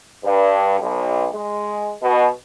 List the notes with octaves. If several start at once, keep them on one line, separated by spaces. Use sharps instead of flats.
G2
B1
G#3
B2